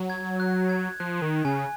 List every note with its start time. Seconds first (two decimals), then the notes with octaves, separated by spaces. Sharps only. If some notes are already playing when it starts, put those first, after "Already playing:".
Already playing: F#3
0.10 G#6
0.40 F#6
0.69 G#6
1.00 F3 F#6
1.22 D#3
1.45 C#3 G#5